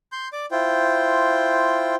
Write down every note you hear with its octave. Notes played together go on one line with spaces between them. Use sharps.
C6 G6
D5 D6
E4 F4 C5 G5